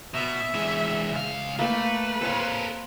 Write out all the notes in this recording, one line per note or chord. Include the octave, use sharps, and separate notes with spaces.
B2 E5
E3 G#3
C#2 F5
A3 A#3 B4 G5
C4 A4 A#4 C#5 F5